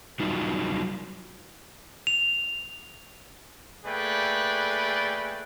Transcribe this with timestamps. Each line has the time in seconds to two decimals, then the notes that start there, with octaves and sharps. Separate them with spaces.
0.20 F#3 G3 D#4 F4
2.07 F7
3.85 A3 A#3 G#4 B4 D5 G5